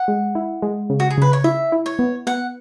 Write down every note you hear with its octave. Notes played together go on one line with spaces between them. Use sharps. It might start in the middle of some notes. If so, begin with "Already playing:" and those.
Already playing: F#5
G#3
E4
G#3
C#3
F#4
G#4
C#3 B4
C#5
E4 E5
E4
C#5
B3
B3 F#5